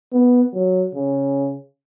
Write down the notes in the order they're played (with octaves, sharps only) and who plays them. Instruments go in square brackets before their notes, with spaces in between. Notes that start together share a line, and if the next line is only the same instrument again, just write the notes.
[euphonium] B3
F#3
C#3